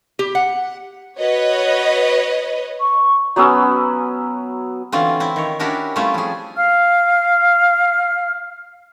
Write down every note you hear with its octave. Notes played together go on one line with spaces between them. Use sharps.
G4
F#5
F#4 B4 C#5 D#5
C#6
F#3 B3 C#4 E6
D3 E3 C4 C#4 F4
C4 E4
D#3 C#5
C#4 D4 E4 F#4 G4 A#4
G3 A3 C4 C#4 E4 F4
F3 G#4
F5 F6